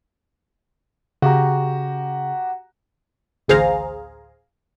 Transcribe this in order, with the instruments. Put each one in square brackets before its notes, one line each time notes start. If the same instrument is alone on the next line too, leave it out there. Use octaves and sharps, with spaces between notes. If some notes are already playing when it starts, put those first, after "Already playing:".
[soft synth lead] C#3 [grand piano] F#4 G4 A#5
[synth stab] A1 D2 G#4 C5 F5 A#5